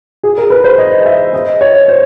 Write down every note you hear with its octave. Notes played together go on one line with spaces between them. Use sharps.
G#4
A#4
B4
C5
D#5
E5
D#5
C#5
C5